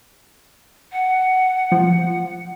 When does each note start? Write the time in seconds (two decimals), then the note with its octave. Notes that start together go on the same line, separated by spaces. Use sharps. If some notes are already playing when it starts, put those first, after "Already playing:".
0.93 F#5
1.72 F3